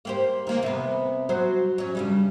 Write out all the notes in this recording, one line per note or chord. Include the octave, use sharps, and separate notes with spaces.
A#3 G4 C5
D#3 A#3
C3 B3
F#3 F#4 C5
F#3 C#4
G2 C#3 G3